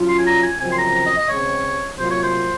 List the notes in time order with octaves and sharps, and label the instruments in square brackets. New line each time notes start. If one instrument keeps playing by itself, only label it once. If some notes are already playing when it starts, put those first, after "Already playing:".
Already playing: [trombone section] F#3 C#4 F4
[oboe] C6
G#5
A#5
G#5
[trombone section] F#2 C#3 F3 C4 [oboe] G#5
[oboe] C6
A#5
A#5
D#5
D#5
[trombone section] C#3 G#3 C4 [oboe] C#5
[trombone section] C3 F#3 A#3 F4 [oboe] C5
[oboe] C#5
C5